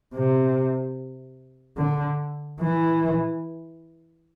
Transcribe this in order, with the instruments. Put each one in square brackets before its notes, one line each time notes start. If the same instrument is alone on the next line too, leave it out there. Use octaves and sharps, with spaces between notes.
[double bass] C3
D3
E3